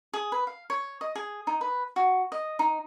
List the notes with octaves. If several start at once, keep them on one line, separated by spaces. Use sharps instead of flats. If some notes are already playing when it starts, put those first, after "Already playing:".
G#4
B4
F5
C#5
D#5
G#4
D#4
B4
F#4
D#5
D#4